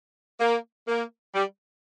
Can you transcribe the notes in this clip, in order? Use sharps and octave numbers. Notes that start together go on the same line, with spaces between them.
A#3
A#3
G3